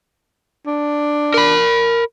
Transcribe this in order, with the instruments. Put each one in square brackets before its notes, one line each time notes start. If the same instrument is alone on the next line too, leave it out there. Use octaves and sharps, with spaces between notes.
[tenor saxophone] D4
[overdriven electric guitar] A#4 B5